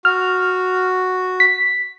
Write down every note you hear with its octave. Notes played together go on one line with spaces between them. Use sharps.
F#4 F6
B6